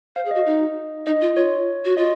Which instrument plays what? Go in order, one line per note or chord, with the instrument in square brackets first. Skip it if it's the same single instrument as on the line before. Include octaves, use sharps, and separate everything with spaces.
[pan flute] C5 [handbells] F5
[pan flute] G#4
[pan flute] F#4 [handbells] D#5
[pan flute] D#4
[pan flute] D#4 [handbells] D#5
[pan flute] F4
[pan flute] F4 [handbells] C#5
[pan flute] F#4
[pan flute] F4 [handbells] D#5